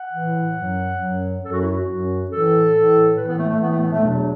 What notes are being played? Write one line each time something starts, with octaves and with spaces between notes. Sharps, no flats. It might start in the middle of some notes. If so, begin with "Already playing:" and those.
Already playing: F#5
A2 E3
F#2 F#3
F#2 F#3
F#2 F#3 A4
F#4
E4
F#4
F#2 F#3
A2 E3 A4
A2 E3
A2 E3 B4
B3
A3
A3
A2 E3 B3
A3
B3
A3
E2 B2 F#3 D4